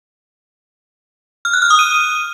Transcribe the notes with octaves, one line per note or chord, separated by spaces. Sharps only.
F6
F#6
F6
D#6
D#7